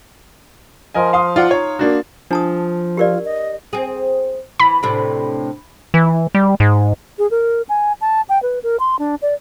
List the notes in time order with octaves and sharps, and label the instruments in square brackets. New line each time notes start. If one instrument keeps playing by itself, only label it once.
[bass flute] F3 [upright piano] A#4 D#5 G#5
[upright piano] F5 C6 D#6
[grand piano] F4 D5 F#5
[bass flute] D#4 [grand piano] C#5
[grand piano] A#3 D4 F#4
[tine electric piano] F3 [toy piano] D4 A5 D#6
[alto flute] F4 [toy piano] G4 A#4 D5
[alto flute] D#5
[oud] C4 G#4
[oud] E3 [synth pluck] B5
[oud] A2 C3 D4
[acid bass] E3
G3
G#2
[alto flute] G#4
A#4
G#5
A5
G5
B4
A#4
C6
D4
D5